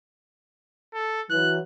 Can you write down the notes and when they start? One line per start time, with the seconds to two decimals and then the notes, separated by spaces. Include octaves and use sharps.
0.94 A4
1.30 E3 F#3 F#6